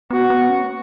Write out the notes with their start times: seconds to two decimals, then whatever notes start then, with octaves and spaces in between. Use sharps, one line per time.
0.11 B3 F#4
0.30 B3
0.49 C#4
0.64 A#3